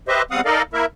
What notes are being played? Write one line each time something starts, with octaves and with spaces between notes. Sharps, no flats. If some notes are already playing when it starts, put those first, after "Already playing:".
G4 B4 C5 D#5 E5
E2 G3 C4 F5 F#5 D#6
D#4 A4 A#4 D5 D#5 F5
A#3 E4 A#4 E5